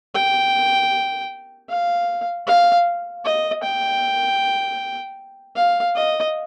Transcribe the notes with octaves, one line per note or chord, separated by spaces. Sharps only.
G5
F5
F5
D#5
G5
F5
D#5